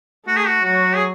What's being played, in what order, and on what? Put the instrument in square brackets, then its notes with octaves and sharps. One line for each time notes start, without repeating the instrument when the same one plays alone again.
[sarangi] A3 [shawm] F#4
[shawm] G#4
F#4
[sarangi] F#3 [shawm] F#4
[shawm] G#4